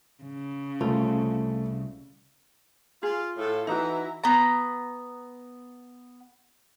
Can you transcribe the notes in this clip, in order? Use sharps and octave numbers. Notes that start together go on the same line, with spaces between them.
C#3
C2 A3 F4
F4 G#4
A2 F4 A4
E3 D#4 E4 F#4 A#5
B3 A#5